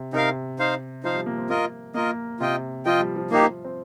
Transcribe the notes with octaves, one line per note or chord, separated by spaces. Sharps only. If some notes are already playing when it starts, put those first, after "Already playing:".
Already playing: C3
C3 D#4 A#4 F5
D#4 C5 F5
F3 D#4 C5 F5
G3
A#3
C4
A#3 F4 A#4 D#5
A#3 F4 A#4 D#5
C3 F4 D#5 G5
F3 F4 D#5 G5
G3
F3
F3 A#3 D#4 G4
F3
C4